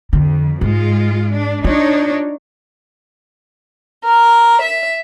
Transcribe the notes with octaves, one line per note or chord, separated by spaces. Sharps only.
F2 D3
G#2 G#3 F4
D4
D4 D#4 F4 C#5
A#4
E5